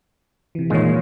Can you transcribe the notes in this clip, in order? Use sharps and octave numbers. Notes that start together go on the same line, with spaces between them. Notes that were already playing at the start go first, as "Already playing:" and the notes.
C3 E3
A#2 D#3 E3 G#3 C#5